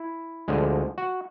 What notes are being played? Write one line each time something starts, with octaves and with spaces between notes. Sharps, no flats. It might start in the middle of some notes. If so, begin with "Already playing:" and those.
Already playing: E4
D2 D3 F3 G#3
F#4